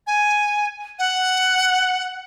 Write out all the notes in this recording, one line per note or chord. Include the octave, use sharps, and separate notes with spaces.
G#5
F#5